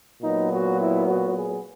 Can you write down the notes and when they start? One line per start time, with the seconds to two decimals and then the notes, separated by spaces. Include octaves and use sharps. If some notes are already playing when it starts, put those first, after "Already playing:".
0.22 A#2 F#3 B3 D#4
0.51 F#4
0.79 E4
1.07 F#4
1.36 G#4